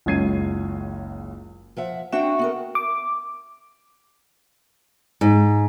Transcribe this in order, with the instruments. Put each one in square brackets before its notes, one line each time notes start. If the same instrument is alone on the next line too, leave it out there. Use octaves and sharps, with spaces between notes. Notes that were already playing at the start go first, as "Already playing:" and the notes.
[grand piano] F#1 C#2 C#4 G#6 C7 D#7
[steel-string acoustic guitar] F3 E5 F#5
[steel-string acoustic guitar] C4 D4 G5 [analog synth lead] F#4 [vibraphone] E5
[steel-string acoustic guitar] B3 A4 A#4
[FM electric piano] D6
[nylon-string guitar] G#2